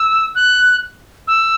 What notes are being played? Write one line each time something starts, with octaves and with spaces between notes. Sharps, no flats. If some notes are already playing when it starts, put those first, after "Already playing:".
Already playing: E6
F#6
E6